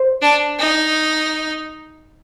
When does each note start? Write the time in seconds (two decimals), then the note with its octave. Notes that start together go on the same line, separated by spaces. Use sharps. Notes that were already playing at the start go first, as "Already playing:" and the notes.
Already playing: C5
0.22 D4
0.59 D#4